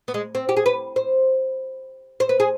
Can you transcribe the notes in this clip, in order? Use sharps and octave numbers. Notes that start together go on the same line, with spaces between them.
B3
G#3
C4
G4
G#4
B4
C5
C5
B4
G#4